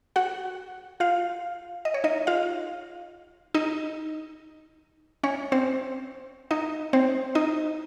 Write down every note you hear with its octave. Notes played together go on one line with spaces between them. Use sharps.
F#4 F#5
F4 F5
D#5
C#5
D#4 D#5
F4 F5
D#4 D#5
C#4 C#5
C4 C5
D#4 D#5
C4 C5
D#4 D#5